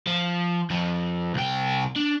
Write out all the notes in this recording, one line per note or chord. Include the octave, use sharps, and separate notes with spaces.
F3
F2 F3
C2 G5
D4